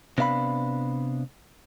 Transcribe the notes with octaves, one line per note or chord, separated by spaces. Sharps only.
C3 B3 D4 E5 F5 B5